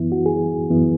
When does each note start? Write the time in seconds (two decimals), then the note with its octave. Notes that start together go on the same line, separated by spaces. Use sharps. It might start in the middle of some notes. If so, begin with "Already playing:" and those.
Already playing: F#2 E3 B3 E4
0.12 F#4
0.26 G#4
0.70 F#2 E3 B3 E4